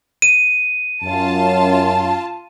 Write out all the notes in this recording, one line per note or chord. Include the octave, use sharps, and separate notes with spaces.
D#7
F#2 F4 A5